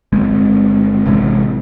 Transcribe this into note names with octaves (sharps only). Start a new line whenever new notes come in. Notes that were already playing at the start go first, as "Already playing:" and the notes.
G1 G#3 C4
A1 C3 G#3